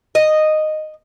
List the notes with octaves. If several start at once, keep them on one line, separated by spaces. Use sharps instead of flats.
D#5